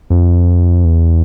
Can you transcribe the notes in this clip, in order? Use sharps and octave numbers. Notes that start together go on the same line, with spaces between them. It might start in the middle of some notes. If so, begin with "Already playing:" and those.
F2
E2